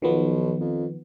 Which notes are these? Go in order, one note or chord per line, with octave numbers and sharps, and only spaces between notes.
B1 D#3 F3 B3
F2